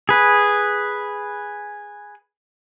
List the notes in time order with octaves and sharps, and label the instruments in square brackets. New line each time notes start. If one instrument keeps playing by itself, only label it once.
[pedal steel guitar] G#4 B4